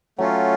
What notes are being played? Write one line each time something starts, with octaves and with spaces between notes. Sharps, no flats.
F#3 A3 C#4 F4